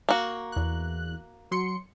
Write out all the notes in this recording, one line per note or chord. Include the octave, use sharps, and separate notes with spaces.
A#3 F#4
E2 F#6
F#3 C6 C#7